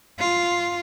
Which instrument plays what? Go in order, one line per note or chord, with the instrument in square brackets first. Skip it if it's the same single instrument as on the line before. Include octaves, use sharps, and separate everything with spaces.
[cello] F4